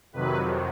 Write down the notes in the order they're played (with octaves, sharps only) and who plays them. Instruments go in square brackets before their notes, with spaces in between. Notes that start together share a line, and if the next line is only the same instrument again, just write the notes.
[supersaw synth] F2 C3 D#3 F#3 B4